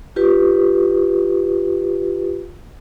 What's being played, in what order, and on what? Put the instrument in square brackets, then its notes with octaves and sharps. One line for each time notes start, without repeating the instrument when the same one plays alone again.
[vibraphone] F4 G4 B4